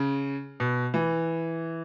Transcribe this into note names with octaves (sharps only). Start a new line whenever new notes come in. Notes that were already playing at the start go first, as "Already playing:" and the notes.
Already playing: C#3
B2
E3